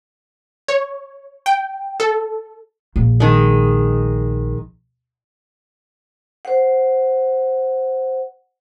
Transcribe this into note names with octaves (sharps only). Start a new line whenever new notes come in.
C#5
G5
A4
A#1
D#3 G#3
C5 F#5